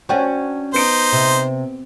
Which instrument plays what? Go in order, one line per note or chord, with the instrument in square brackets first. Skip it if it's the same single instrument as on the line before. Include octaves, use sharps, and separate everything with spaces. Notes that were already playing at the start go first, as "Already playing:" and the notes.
[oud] C#4 D4 F#4 [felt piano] C5 C#5 G5
[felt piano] B3 D7 [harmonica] D#4 C5
[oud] C3